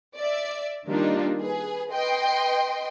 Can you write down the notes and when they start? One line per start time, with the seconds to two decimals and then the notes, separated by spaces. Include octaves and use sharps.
0.16 D5 E5
0.86 D#3 G3 A#3 D4 D#4 F4
1.40 G#4 B4
1.90 B4 D#5 G5 C6